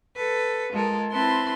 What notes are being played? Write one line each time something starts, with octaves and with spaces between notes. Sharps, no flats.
A4 B4
G#3 F4 A4 A#4
C4 E4 B4 A5 C6